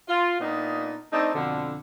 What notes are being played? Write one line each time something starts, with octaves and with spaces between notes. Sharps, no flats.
F4
A#2 B3 D4 D#4
A3 C4 D4 D#4
F2 B2 D3